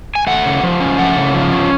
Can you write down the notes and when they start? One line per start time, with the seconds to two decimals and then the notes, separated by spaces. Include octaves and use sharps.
0.15 G#5
0.27 A3 F#5
0.45 C#3
0.63 F3
0.80 C#4
0.98 A3 F#5
1.16 C#3
1.34 F3
1.52 C#4